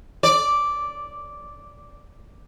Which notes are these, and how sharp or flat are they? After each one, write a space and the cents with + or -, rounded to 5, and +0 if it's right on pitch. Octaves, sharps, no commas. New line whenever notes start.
D5 -5